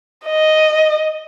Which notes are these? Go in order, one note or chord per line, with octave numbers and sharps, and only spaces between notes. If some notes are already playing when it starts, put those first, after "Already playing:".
D#5